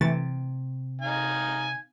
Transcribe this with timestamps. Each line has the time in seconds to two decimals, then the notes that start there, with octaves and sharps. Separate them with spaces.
0.01 C3 E3 A3 A6
1.02 D#4 F5 G#5